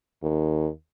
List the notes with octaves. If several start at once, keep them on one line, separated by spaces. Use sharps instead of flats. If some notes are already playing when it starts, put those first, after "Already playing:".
D#2